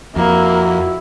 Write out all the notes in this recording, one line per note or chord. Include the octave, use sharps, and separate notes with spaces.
F2 A#3 E4 F#4